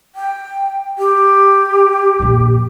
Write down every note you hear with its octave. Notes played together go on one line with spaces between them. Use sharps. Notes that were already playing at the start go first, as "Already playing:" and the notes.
G5
G4
F2 A#2